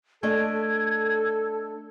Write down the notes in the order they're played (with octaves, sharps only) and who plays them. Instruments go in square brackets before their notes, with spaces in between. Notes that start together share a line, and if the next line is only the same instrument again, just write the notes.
[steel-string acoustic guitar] A3 D4 D#5 [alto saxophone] A4 [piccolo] G#6